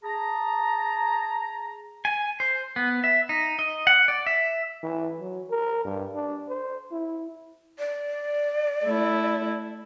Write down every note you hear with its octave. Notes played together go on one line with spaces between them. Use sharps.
G#4 A5 A#5
G#5
C5
B3
E5
D#4
D#5
F#5
D5
E5
E3
F#3
A#4
G2
D4
C5
E4
D5
A3 E4